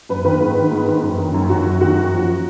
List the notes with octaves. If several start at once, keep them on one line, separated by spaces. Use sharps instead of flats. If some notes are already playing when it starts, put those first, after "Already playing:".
F#2 B4
D#3 B4
G#2
D#3
G#2
D#3
F#2
D#3
F#2
D#3 F#4
F#2
D#3 F#4
F#2
F3